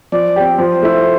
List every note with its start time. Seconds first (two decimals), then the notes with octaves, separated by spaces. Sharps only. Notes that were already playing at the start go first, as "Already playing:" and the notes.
0.12 F3 D5
0.36 C4 G4
0.58 F3 C5
0.82 A3 E4